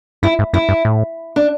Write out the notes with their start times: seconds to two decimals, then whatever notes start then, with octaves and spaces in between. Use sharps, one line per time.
0.23 G2 E4
0.39 G#2
0.53 F#2 E4
0.69 G2
0.85 A2
1.36 D4